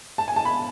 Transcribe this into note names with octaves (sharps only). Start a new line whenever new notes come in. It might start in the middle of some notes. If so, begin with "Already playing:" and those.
A5
G#5
A5
B5